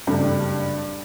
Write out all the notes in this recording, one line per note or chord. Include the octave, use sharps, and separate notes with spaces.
F#1 G2 G3 A3 D4